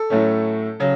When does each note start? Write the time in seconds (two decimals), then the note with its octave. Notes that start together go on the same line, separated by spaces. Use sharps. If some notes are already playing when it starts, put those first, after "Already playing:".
Already playing: A4
0.10 A2 F#3 A3 C#4
0.80 C#3 F#3